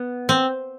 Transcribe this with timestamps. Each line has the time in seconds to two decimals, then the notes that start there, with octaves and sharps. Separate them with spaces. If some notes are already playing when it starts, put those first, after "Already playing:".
Already playing: B3
0.29 C4